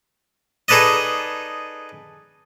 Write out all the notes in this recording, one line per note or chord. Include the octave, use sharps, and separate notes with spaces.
D#4 G#4 A4 B4 D5 D#5